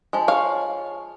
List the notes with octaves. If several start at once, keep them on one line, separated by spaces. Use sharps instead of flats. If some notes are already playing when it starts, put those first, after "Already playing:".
F3 G#3
C#5 F5